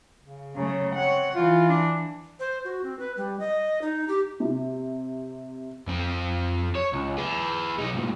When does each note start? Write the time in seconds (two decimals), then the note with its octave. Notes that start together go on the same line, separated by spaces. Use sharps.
0.24 C#3
0.56 C#3 F#3 A3
0.95 C4 C#5 F#5
1.35 E3 F4
1.69 D4
2.40 C5
2.65 F#4
2.84 C4
2.99 B4
3.17 G3
3.40 D#5
3.82 D#4
4.08 G4
4.40 C3
5.87 F2 C4
6.75 C#5
6.93 C#2
7.18 G#4 B4
7.78 B1 D#4
7.95 G2 A#2